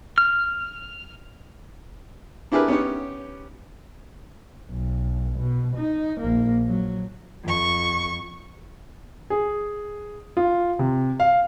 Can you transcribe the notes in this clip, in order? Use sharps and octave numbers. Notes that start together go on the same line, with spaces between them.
F6
D4 E4 G4 G#4 A#4 B4
B3 C#4 D#4 G4 C#5
B1
B2
D#4
A#1 A#3
F#3
F2 C#6
G#4
F4
C3
F5